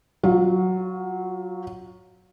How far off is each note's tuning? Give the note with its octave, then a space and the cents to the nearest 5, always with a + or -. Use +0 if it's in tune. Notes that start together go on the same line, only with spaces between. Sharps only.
F#3 +0 F4 +25